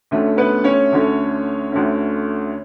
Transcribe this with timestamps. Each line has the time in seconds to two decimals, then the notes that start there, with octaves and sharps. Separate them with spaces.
0.11 D2 D3 A3 C#4
0.37 B3 B4
0.64 C#4 C#5
0.92 D2 D3 A3 C#4
1.72 D2 D3 A3 C#4